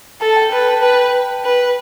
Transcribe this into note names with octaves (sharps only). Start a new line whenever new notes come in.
A4 A5
G5
B4 G5
A5
B4 G5
B4